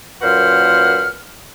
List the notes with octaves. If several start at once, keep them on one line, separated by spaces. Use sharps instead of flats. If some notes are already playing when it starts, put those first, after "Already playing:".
F#2 A#2 B4 C5 F#5 F6